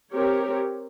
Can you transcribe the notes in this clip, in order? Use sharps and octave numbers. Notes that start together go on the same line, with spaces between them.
C4 G4 A#4 C#5